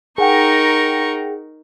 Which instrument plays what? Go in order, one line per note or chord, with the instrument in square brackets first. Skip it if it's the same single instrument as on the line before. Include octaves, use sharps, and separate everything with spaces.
[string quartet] D#4 A#4 C#6 [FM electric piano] G#4 F#5 G5